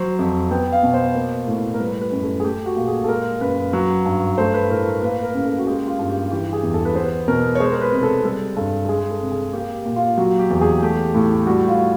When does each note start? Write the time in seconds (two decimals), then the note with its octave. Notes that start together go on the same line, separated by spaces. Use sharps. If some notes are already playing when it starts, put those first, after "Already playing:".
Already playing: F#3 C5
0.19 F2
0.51 B3 G5
0.73 F5
0.83 B2
0.94 C5
1.15 A#3
1.47 A2
1.74 A#4
1.80 G3 B4
2.01 B4
2.12 F#2
2.23 A4
2.40 G#4
2.44 A3 G4
2.66 F#4
2.76 A#2
2.87 G#4
3.04 A4
3.08 G#3 A#4
3.41 F#2 B4
3.73 F#3
4.05 G2
4.38 A3 C5
4.54 B4
4.70 A2 A#4
4.86 A#4
5.02 A#3 B4
5.23 A#4
5.34 C#3
5.45 A4
5.58 F#4
5.67 G#3 G4
5.88 F4
5.99 G2
6.10 G4
6.31 E3 G4
6.53 G#4
6.63 E2
6.74 A4
6.85 B4
6.96 B3 C5
7.28 B2 A#4
7.55 C#5
7.60 G#3 C5
7.72 A#4
7.81 B4
7.92 C3
8.03 A4
8.24 G3 A4
8.56 G2 A4
8.85 A4
8.89 G#3 G#4
9.10 A4
9.21 C3
9.31 G#4
9.53 A#3 G4
9.86 A#2
9.96 F4
10.18 F#3 F#4
10.39 G4
10.50 E2
10.61 G#4
10.82 A3 G4
11.14 A2
11.47 G3 F#4
11.68 F4